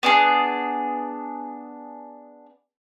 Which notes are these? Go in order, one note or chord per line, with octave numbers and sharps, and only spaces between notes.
B3 D4 E4 G#4